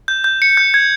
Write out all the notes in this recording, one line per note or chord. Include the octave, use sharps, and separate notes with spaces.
G6
G6
C#7
G6
G#6